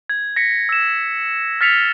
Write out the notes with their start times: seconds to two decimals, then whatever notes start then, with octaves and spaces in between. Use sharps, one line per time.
0.09 G#6
0.36 A#6 B6 C#7
0.69 E6 E7
1.61 F6 A6 B6 C#7 F7